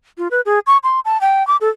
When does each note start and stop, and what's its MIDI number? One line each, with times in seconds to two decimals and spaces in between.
0.18 0.28 65
0.31 0.41 71
0.46 0.59 68
0.67 0.78 85
0.83 1.00 84
1.05 1.20 81
1.21 1.46 79
1.47 1.57 86
1.61 1.69 69